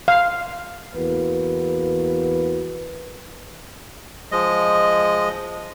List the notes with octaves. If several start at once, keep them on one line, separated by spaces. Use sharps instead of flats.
F5
E2 A#3 F#4 B4
F3 G#3 D#5